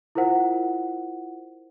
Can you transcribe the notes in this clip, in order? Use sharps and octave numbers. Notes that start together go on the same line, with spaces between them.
E4 F4 A#4 C5 F#5